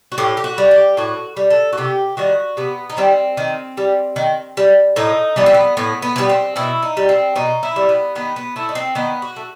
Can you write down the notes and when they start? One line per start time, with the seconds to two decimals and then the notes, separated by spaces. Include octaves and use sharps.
0.12 F#4
0.18 A2 G4
0.37 G4
0.44 F#4
0.58 G3
0.71 G4
0.97 A2 F#4
1.37 G3
1.50 A4
1.73 F#4
1.78 C3 G4
2.17 D#3 G3 F#4
2.57 C3 B3
2.90 D#4
2.97 D#3 G3 C4
3.37 D#3
3.77 G3
4.16 D#3
4.57 G3
4.96 A2 D#4
5.36 E3 G3 B3
5.46 C4
5.54 B3
5.77 A2 B3
6.02 B3
6.16 E3 G3 B3
6.29 C4
6.56 B2 E4
6.83 D#4
6.97 G3
7.09 C4
7.36 B2 D#4
7.63 E4
7.76 G3
7.89 B3
8.15 D#3 B3
8.36 B3
8.56 A3 E4
8.69 D#4
8.75 C4
8.95 D#3 B3
9.22 F#4
9.36 A3